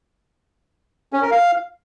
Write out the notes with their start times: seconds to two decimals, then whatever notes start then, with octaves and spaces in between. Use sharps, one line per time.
1.13 C#4
1.22 A#4
1.31 F5